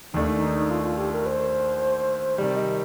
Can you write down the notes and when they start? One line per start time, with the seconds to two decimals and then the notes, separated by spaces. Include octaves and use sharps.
0.13 D#2 D#3 A3 D4 D#4
0.37 D#4
0.70 F4
0.84 F4
0.98 G4
1.12 A#4
1.26 C5
2.38 C3 D#3 G3 D5
2.57 D#5